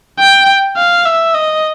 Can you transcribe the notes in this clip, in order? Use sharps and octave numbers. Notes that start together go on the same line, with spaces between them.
G5
F5
E5
D#5